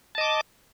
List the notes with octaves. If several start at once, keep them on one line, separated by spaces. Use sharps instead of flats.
D#5 A5 D6